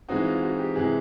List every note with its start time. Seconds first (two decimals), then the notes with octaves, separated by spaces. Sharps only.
0.09 E3 G#3 C4 D#4 F#4
0.25 F4
0.43 F#4
0.59 G4
0.75 C3 E3 G#3 G#4